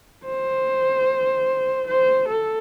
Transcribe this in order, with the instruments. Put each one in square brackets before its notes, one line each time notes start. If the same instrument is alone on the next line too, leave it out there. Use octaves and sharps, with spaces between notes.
[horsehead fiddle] C5
C5
A4